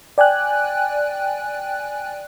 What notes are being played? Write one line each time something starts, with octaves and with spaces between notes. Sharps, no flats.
D5 G5 G#5 F#6